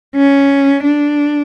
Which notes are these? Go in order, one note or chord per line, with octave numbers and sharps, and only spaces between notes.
C#4
D4